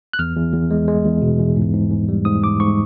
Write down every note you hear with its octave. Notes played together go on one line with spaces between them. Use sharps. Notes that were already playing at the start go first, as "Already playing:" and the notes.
F#6
E2 F6
E2
E2
G#3
G#3
E2
B2
E2
G#2
G#2
G#2
G3
G#2 D#6
G#2 D6
G#2 C#6